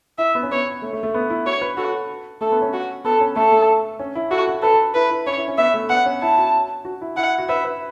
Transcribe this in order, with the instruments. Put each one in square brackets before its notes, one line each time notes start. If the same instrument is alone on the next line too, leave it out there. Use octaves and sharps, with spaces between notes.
[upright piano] E4 [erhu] E5
[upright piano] B3
C#4
[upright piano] B3 [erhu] C#5
[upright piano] A3
A3
A3
B3
E4
[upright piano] F#4 [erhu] C#5
[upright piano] B4
[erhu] F#4 [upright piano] A4
[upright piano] A3 [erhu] A4
[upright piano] B3
C#4
[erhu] F#4
[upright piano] B3 [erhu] A4
[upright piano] C#4
[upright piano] A3 [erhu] A4
[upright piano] A3
C#4
E4
[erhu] F#4 [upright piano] A4
[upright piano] F#4
[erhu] A4 [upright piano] B4
[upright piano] A4
[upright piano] E4 [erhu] B4
[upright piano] E4
[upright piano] C#4 [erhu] C#5
[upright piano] E4
C#4
[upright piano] B3 [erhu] E5
[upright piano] A3
[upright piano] B3 [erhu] F#5
[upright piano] C#4
[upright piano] E4 [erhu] A5
[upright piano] F#4
F#4
E4
[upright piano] E4 [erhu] F#5
[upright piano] F#4
[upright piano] B4 [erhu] E5
[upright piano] B4